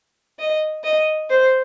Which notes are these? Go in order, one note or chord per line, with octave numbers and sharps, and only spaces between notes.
D#5
D#5
C5